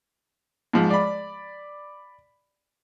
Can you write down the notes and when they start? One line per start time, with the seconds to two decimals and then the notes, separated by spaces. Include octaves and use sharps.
0.73 G#2 F3
0.90 D5 B5